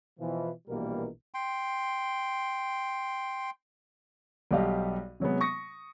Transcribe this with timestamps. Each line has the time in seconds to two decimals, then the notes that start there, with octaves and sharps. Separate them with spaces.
0.19 B2 E3 F3
0.68 A#1 B2 E3 G3 A#3 A#4
1.34 G5 C6
4.51 B1 G3 G4 D#5 F5
5.20 C3 F#3 G#3 B3
5.41 C#6 D#6 A#6 C#7